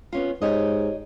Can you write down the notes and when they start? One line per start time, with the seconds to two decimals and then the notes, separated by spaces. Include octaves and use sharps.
0.13 B3 C#4 F4
0.42 G#2 G4 C#5 D#5